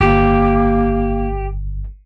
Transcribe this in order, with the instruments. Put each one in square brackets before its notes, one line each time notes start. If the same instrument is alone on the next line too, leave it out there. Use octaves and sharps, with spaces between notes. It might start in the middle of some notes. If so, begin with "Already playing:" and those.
[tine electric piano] G1 [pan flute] A#3 [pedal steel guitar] G4